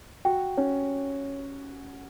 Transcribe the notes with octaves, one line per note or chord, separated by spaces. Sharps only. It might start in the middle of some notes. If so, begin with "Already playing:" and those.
F#4 G5
C#4 C#5